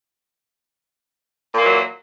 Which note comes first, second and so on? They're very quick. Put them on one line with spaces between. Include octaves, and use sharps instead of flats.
A#2 A#3 E3 F#3